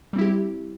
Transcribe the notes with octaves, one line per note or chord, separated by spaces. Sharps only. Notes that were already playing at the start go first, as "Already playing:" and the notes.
G3 C4 E4 G4